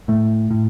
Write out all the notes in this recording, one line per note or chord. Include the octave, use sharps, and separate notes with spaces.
A2 A3
A2